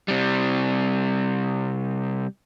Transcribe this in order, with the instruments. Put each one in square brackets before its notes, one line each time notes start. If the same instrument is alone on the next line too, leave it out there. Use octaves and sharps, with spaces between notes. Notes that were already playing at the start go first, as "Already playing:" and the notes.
[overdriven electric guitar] C3 G3